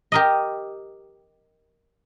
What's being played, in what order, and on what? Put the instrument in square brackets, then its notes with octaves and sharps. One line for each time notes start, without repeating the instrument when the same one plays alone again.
[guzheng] G4 A#4 D#5